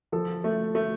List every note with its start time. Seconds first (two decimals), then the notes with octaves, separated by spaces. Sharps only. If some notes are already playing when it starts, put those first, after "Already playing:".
0.12 F3 A4
0.44 A3
0.75 A3